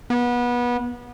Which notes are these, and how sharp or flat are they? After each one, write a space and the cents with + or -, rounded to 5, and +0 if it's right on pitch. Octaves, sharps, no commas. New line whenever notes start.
B3 -25